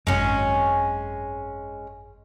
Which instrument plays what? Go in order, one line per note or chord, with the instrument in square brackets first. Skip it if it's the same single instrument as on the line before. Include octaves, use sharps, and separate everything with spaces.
[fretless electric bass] G#1 F#2 [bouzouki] G#3 C#4